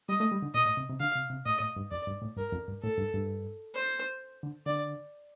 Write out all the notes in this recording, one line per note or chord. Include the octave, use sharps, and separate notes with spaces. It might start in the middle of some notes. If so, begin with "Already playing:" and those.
G3 D#5
A3
G3
D3
A#2 D#5
A2
C3
C3
D3 F5
C3
C3
A2 D#5
A2
G2
F2 D5
G2
A2
G2 A#4
F2
G2
A2 A4
G2
G2
C5
D3
D3 D5